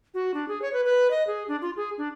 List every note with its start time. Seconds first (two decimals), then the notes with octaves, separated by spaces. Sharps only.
0.14 F#4
0.34 D4
0.48 G#4
0.62 C#5
0.73 B4
0.85 B4
1.11 D#5
1.27 G#4
1.48 D4
1.62 F4
1.77 G#4
1.98 D4